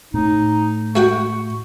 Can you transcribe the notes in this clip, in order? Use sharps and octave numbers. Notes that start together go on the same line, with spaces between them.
A2 D#4
A3 F#4 G5 C#6